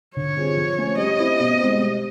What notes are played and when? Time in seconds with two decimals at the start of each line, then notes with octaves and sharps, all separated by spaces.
0.17 D3 C#5
0.36 G3 C4 F4 G#4
0.57 F3
0.78 A3 C#4
0.98 G3 D#5
1.19 C4 E4 G4
1.39 B2
1.60 G#3 C4
1.80 G3